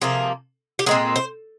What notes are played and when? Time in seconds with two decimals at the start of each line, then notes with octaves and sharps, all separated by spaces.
0.01 C3 F3 A#3 G#4
0.79 G4
0.86 A#2 G#3 C4 G#4
1.16 C5